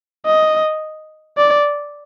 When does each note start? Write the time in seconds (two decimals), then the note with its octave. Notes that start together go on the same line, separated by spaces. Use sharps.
0.26 D#5
1.37 D5